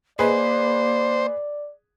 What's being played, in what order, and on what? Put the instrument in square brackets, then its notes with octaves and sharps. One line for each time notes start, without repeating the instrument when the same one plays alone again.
[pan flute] A#3 [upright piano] G#4 B4 D#5 [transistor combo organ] C5 [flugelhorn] D5